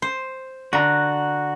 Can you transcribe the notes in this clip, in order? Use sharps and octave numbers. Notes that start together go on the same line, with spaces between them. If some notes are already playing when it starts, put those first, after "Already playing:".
C5
D3 F#4 A#5 F#6